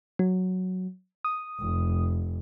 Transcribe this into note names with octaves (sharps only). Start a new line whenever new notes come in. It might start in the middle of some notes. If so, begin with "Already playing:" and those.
F#3
D#6
F1